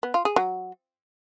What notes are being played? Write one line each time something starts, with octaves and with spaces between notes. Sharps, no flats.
B3
F4
G#4
F#3